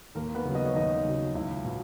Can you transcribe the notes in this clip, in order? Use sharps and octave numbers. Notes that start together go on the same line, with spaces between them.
D#2 A#3 A#4
B3 B4
C#3 F#3
D#5
C#5
D#2 D#4 D#5
C#3 F#3
C#2 E4 E5
B2